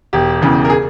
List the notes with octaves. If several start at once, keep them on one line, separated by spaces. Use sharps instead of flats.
E1 G4
E2 C#3 E3
A#4
G#4